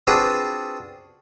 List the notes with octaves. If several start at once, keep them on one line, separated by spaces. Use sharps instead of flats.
C4 D4 F4 F#4 G#4 B4